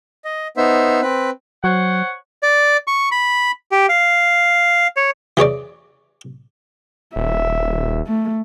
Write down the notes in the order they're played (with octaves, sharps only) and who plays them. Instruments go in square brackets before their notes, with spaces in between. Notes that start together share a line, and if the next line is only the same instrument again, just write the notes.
[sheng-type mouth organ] D#5
B3 D#4 C5 E5
C4 B4
[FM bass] F#3 [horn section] C5 C#5 F#5
[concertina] D5
C#6
B5
G4
F5
C#5
[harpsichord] E3 G#4 C#5 D5
[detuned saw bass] D#1 [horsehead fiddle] E5
[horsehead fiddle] A3